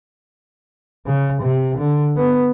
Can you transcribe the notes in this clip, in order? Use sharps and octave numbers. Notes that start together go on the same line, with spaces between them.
C#3
C3
D3
B3